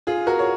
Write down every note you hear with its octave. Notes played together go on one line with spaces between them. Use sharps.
F4 G#4
F#4 A#4
C#5